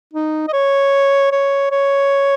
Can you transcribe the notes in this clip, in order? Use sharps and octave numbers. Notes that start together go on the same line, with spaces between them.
D#4
D#5
C#5
C#5
C#5